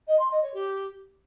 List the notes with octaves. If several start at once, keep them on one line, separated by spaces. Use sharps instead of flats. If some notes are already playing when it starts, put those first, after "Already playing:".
D#5
C6
D#5
C#5
G4